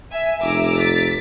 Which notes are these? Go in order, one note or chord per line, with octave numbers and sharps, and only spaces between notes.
E5 G#5
F1 A#5 D6 E6
A6 B6